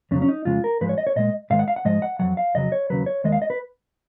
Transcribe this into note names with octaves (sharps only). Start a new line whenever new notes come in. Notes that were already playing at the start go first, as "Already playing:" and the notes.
F2 C#3 F#3 C#4
C#4
D#4
F2 C#3 G#3 F4
A#4
G#2 F3 G#3 B4
C#5
D#5
C#5
A#2 G#3 D#5
G#2 D#3 G#3 F5
F#5
F5
F#5
G#2 F3 G#3 D#5
F#5
F2 D#3 F#3 F#5
F5
F2 C#3 F#3 D#5
C#5
D#2 C#3 F#3 B4
C#5
D#2 D#3 G#3 D#5
F5
D#5
B4